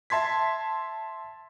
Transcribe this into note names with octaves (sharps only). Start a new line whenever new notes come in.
E5 A5 C6 G#6 B6